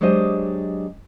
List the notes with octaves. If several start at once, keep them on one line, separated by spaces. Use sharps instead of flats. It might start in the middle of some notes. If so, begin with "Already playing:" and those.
F#3 G#3 D4 G4 C5 D#5